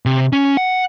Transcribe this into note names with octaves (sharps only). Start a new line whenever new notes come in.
C3
C#4
F#5